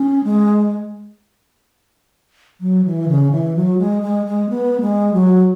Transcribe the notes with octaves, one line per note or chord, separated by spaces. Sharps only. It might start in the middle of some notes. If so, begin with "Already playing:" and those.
Already playing: C#4
G#3
F#3
E3
C#3
E3
F#3
G#3
G#3
G#3
B3
G#3
F#3